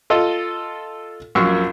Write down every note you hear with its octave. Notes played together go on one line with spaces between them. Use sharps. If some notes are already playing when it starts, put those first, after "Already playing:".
F4 A4 D#5
A#1 F#2 A#4 C#6 E6